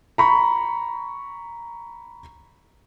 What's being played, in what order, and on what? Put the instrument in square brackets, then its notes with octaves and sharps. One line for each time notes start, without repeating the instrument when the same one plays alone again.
[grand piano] A#5 B5 C#6